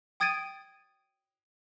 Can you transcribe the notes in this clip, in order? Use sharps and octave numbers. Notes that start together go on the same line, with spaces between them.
G5 D#6 G#6 A6 D7 D#7